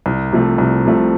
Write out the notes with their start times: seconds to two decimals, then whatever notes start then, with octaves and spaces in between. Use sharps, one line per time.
0.06 C2
0.32 C3 F3 A3
0.58 C2
0.85 C3 F3 A3